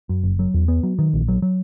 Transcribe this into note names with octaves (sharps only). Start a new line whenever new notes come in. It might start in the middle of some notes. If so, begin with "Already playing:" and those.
F#2
F#1
F#3
E2
B3
F#3
D#3
A#1
F#3
F#3